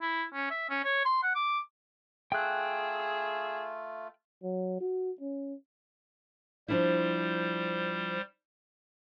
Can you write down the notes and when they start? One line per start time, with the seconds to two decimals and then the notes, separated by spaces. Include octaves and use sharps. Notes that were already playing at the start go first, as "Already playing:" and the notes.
0.01 E4
0.33 C#4
0.50 E5
0.69 C#4
0.84 C#5
1.05 C6
1.23 F#5
1.35 D6
2.32 A3 F4 G#4 G5 E6 F#6
4.43 F#3
4.80 F#4
5.21 C#4
6.68 F3 G3 D4 E4 C5